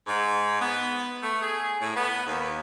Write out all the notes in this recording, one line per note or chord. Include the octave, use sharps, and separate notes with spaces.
G#2
B3
A3
G#4
A2
B3
D#2